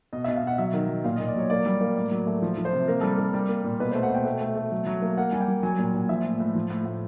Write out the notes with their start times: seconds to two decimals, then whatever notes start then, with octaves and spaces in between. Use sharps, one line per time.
0.13 B2 D#5
0.24 E5
0.28 B2
0.36 F5
0.43 B2 F#5
0.58 F#3 E5
0.73 D#3
0.89 F#3
1.04 A#2 F5
1.16 D#5
1.20 A#2
1.28 D5
1.35 F#3 C#5
1.50 A#3 D5
1.66 G3
1.81 A#3
1.96 A2 D5
2.11 F#3
2.27 A3
2.42 F3
2.58 F3
2.65 C5
2.73 C3
2.88 A#3 A#4
3.01 G3 A4
3.15 G3 A#4
3.34 G3
3.49 A#3
3.64 A#2
3.80 B2 B4
3.91 C5
3.95 A3
4.03 F#5
4.10 B2 G5
4.25 A3
4.41 A3
4.56 A3
4.72 F#3
4.87 F#3
5.02 A#3
5.17 A#3 F#5
5.32 G3 G#5
5.40 G5
5.48 G3
5.63 F#3 G#5
5.79 A#2
5.94 A#2
6.09 F3 E5
6.24 A2
6.40 A2
6.55 F3
6.70 A2
6.86 A2